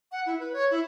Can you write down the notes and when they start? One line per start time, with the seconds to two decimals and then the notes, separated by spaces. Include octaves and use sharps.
0.12 F#5
0.26 E4
0.39 B4
0.53 C#5
0.71 E4